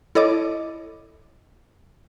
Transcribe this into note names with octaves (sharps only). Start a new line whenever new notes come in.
E4 A4 C#5 D#5 D6